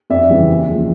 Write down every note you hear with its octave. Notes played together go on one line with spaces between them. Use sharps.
F2 D5 E5
C#3 E3 G3
D#2
C#3 F3 G#3